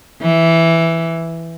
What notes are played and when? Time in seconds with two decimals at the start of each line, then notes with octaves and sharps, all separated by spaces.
0.22 E3